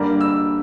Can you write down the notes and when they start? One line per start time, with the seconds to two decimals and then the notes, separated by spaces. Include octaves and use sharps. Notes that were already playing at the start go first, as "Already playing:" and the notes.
Already playing: G2 D3 G3 A#3
0.21 E6